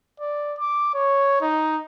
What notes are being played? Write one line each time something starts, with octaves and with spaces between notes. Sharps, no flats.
D5
D6
C#5
D#4